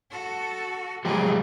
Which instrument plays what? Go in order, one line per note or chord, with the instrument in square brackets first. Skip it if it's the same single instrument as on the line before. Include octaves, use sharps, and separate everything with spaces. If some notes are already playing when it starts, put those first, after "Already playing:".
[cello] F#4 A4
[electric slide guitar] F3 G#3 G4 [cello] F#3 G#4